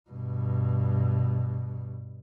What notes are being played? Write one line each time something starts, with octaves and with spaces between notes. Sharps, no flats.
G2 B2